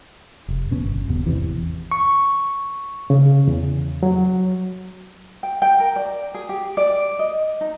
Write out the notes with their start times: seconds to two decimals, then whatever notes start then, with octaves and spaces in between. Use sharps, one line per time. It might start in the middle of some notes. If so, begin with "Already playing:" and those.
0.48 F1
0.71 D#1 B2 C#4
0.84 G1
1.08 D#1 B2
1.26 G#1 E2 C3 E3
1.91 C#6
3.10 C#3
3.47 E2
4.03 F#3
5.43 G5
5.62 G5
5.80 A#4
5.96 D5
6.34 G#4
6.49 G4
6.77 D5
7.19 D#5
7.61 D#4